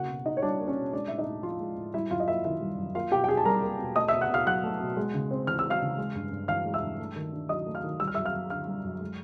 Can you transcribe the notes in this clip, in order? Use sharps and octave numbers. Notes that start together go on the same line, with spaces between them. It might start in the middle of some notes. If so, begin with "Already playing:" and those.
Already playing: C#3 A#3 F#4 F#5
B2
D#4 D#5
C#5
G3 D4 D5
A#3
C#4 C#5
B2
G#3 D4 D5
A2 E5
D#4 D#5
A2
F3 F4 F5
G#3
A2
G3 E4 E5
F#2 F4 F5
D#5
A#3 E4 E5
D#3 E4 E5
G3
F#2
A#3 F4 F5
B2 G4 G5
G5
B2 G#4 G#5
A5
G3 A#4 A#5
A#3
B2
A3 D#5 D#6
B2 E5 E6
F#5 F#6
B2 F5 F6
F#3 F#5 F#6
A3
B2
G#3
C#3
C4
E3 F6
E6
G#3
F5 F6
C#3
G#3
G2
G2
E3 F5 F6
G#3
E5 E6
G2
A3
D#3
D4
F#3 D#5 D#6
A3
F5 F6
D#3
G3 E6
F6
F#2 E5 E6
F5 F6
F#2
D3 F5 F6
G3
F#2
G#3